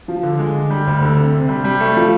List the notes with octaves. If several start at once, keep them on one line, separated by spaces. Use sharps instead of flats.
F3
D3
G#3
D3
G3
D2
D3
C3
C3
G3
G3
A3
F3